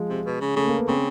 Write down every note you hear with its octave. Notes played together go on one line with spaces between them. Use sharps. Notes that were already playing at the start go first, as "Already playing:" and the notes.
Already playing: F3 G#3
C3
B2
C#3
C#3 A3
A#3
B3
C#3 C4